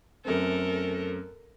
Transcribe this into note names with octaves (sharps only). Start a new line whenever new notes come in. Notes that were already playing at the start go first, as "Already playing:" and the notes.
F#2 A3 C4 A4 A#4